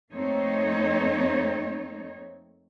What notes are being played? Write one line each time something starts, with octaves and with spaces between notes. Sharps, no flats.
F2 A3 A#3 C4 D#4 C#5